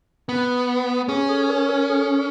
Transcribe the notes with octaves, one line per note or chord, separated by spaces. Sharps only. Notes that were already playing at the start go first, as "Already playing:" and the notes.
B3
C#4 G#4
A4
A#4
A#4
A4